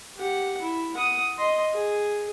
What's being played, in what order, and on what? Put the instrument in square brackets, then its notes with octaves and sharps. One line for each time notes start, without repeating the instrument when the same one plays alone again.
[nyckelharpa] G4 F#5
E4
F#5 D#6
D#5 C6
G#4